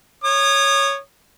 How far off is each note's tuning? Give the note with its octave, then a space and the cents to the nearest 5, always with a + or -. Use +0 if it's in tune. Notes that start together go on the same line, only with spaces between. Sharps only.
C#5 +0 D#6 -35